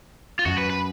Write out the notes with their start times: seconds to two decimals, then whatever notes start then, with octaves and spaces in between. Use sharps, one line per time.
0.39 F4
0.46 F#2 F#4
0.58 B4
0.70 B4